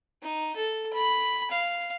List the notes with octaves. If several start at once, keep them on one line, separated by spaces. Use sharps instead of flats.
D#4
A4
B5
F5